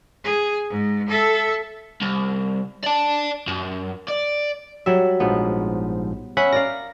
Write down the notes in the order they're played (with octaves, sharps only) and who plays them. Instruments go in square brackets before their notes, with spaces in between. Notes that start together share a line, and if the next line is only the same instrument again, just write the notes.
[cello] G#4
G#2
A4 E5
[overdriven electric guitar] C2
D5 A5
F#2
D5
[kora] F#3 G3 E5
[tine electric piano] A#1 G#2 F3 [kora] B3
[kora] C#4 [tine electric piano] E5 F#5 B5
[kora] A#4 D5 F5 [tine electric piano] A#6